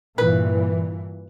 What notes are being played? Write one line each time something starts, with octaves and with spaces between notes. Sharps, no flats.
G2 A#2 E3 B4